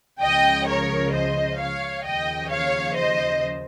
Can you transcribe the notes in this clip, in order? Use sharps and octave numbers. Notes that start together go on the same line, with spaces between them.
C#2 C#3 F3 D#5 G5
A#4 C#5
C5 D#5
C#5 F5
D#2 C#3 F3 D#5 G5
C#5 F5
C5 D#5